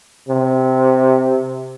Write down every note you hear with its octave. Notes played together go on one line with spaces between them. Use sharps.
C3